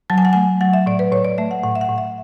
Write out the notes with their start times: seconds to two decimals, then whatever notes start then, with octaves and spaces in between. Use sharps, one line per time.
0.10 F#3 A5
0.18 G#5
0.25 F#5
0.33 A3 G#5
0.61 F#3 F#5
0.73 E5
0.86 A2 D5
0.99 B4
1.12 A2 C#5
1.25 D5
1.38 A3 E5
1.51 F#5
1.63 A2 F#5
1.75 E5
1.81 F#5
1.89 A2
1.98 E5